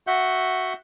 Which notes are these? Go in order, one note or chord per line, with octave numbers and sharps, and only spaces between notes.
F#4 E5 F#5 G6